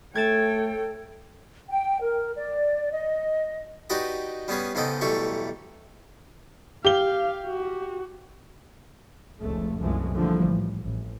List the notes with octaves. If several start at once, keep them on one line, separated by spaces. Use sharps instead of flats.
A3 A4 C#5 G5 G#6 A6 E7
G5
A#4
D5
D#5
D#4 F#4 G4 B4 D5 D#5
G3 B3 C#4 G#4 B4
G#2 C#3 B3 A4 D#5 G5
B1 E3 G3 A3 A4 C#6
G4 F5 G7
F#4
F1 C#2 A3
C2 F#2 E3 F3 G#3 A3
D3 E3 F3 G3 A3 A#3
A1
A1